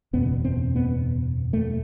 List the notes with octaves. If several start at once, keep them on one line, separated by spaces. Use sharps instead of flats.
F#1 E2 B2 B3
C4
B3
A3